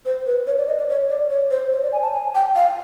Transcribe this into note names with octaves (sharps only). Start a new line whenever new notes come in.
C5
B4
C#5
D5
D#5
D5
C#5
D5
C#5
C5
C#5
D5
G#5
A5
G#5
G5
F5